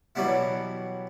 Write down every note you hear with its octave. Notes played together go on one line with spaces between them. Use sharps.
B2 E3 F#3 G3 B3 E4